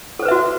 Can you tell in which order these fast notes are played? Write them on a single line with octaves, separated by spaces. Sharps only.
A4 C5 B4 E5 F#4